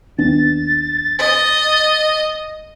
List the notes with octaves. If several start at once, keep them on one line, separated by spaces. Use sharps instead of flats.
D#2 B3 D4 A6
D#5